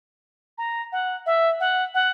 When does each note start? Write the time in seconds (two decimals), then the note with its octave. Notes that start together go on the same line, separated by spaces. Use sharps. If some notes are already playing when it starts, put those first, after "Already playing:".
0.58 A#5
0.92 F#5
1.26 E5
1.60 F#5
1.94 F#5